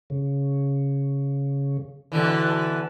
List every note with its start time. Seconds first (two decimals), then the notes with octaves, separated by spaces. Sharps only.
0.10 C#3
2.12 B2 D3 E3